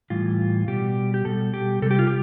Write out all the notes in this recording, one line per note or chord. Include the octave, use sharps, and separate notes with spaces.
A2 E3 G3 F4
B2 G3 G4
G4
B2 G3 A4
G4
C3 G3 G4 A4
F4
G4